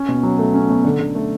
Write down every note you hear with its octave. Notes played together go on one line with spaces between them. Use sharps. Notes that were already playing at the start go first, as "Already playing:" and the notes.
Already playing: C#4
B2
F#3
A3
C#4
B2
D3
D3
A3